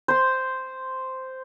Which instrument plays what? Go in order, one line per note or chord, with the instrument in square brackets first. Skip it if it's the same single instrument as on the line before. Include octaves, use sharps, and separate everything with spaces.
[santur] C5 C6